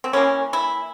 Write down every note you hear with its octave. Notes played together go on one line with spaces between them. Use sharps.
C4
E3 A#3 C#4
E4